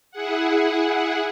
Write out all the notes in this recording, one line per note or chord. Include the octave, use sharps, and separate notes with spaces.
E4 G#4 F#5